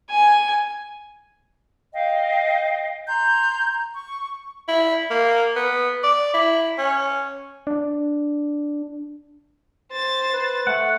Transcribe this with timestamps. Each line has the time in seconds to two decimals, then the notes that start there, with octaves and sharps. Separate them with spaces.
0.10 G#5
1.93 D#5 F5 G5
3.07 A#5 C6 G6
3.93 C#6
4.68 E4
5.11 A#3
5.56 B3
6.04 D5
6.34 E4
6.78 C#4
7.67 D4
9.92 C5 A6
10.33 B4
10.67 A3 F#5